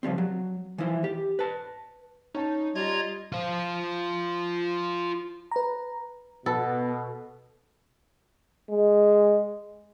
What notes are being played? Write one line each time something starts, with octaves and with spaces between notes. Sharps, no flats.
C#3 F3 G3 C4
F#3
E3 F3 E4 C5
G4
B4 A5
C#4 D#4 A5
G3 F4 D#5 A#5 G#6
F4 C5
B4 A#5
B2 B3 A4 B4
G#3